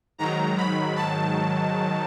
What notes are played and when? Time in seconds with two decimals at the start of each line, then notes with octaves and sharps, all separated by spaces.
0.18 G#2 D#3 F#3 A#5
0.57 B5
0.96 A5